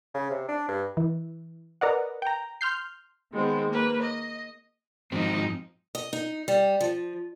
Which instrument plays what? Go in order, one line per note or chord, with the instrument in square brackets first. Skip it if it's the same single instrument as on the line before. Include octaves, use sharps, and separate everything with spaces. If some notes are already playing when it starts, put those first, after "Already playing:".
[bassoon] C#3
C3
D4
G2
[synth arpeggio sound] E3
A#4 B4 D5 D#5 F#5
G5 A#5
C6 F6 G6 C7
[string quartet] D#3 G#3 B3 C4
A#3 B4
D#5
[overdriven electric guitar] G#2 C4 [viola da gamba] F3 D#4
[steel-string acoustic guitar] D#5
D#4
G3
F3